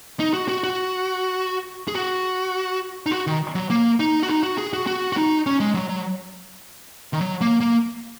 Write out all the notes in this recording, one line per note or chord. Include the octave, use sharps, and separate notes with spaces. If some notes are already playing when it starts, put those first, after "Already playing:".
D#4
F#4
F#4
F#4
G#4
F#4
D#4
F#4
D#3
F#3
A#3
D#4
F#4
D#4
F#4
G#4
F#4
F#4
F#4
D#4
C#4
G#3
F#3
F#3
D#3
F#3
A#3
A#3